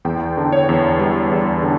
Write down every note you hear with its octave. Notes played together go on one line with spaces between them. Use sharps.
E2 G5
D3
C#5
E2
G3
E2
D3